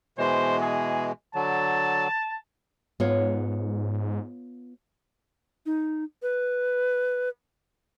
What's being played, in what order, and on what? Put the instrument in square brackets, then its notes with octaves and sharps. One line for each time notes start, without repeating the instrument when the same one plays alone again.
[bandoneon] B2 E3 G#3 [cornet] C5
[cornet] G#4
[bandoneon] D3 F#3 [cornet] A5
[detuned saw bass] G#2 [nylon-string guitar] B3 F4 C#5
[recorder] D#4
B4